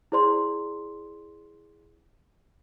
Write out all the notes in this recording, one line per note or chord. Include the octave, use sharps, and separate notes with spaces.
E4 G#4 C5 D5 C6